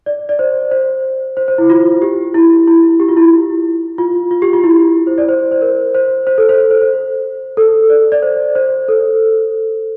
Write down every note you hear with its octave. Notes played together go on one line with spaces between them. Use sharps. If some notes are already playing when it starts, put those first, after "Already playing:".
D5
D5
C5
C5
C5
C5
E4
F4
G4
E4
E4
G4
F4
E4
F4
F4
G4
F4
E4
C5
D5
C5
C5
A#4
C5
C5
A4
C5
C5
C5
A4
D5
D5
C5
C5
A4